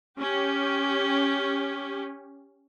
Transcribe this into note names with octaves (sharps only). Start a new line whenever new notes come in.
C#4 G4